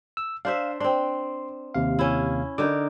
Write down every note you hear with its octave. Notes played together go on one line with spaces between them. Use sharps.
E6
D4 C5 E5 F5
C4 D4 C6
D#2 C3 F5
C#4 E4
D3 D#4 A#4 D6